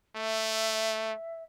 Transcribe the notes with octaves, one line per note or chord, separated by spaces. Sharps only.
A3 E5